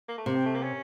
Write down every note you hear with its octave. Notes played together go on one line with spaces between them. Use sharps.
A#3
A3
C3 A#3
C4
A3
A#3
C#4